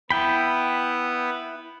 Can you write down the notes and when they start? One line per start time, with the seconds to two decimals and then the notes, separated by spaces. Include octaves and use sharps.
0.11 B3 E4 B4 G5 B5